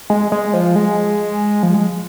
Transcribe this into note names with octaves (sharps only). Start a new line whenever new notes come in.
G#3
G#3
F3
G#3
F3
G#3